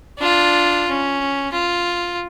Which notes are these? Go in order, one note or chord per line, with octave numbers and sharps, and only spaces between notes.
D4 F4
C#4
F4